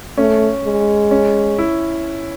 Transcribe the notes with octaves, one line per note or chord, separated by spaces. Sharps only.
A3 C#4
G#3
C#4
E4